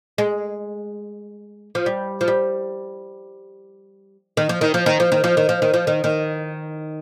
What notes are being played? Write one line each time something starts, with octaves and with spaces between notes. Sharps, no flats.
G#3
F3
G3
F3
G3
D#3
F3
D#3
F3
D#3
F3
D#3
F3
D#3
F3
D#3
F3
D#3
D#3